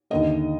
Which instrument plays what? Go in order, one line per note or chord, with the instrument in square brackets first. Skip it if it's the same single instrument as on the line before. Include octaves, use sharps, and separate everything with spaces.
[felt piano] D#2 D3 A3 D#5